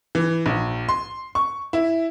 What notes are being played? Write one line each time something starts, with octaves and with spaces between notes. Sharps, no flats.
E3
A#1
C6
C#6
E4